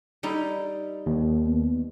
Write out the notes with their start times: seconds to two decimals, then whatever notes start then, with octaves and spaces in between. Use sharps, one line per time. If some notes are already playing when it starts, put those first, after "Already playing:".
0.23 G3 D#4 E4
1.06 D#2
1.47 B3